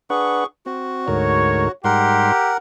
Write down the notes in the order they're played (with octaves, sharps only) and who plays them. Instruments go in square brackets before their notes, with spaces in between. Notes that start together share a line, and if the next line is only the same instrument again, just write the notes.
[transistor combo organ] D4 B4 F#5 [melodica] G#4 C#6
[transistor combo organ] C4 [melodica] F#4
[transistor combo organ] D2 G#2 A#4 [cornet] C#5
[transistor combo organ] G#2 G3 C6 [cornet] G4 [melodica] A#4 F#5